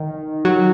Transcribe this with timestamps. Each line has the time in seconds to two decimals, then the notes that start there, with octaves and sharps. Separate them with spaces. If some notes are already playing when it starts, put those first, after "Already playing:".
Already playing: D#3
0.45 F#3